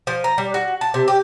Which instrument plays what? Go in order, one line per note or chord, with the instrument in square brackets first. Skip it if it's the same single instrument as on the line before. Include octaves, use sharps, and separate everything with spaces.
[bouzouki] F3
A#5
G3
F#4
A5
C3
G4